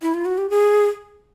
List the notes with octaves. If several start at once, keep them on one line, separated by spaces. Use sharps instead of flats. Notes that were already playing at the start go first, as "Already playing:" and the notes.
E4
F4
F#4
G4
G#4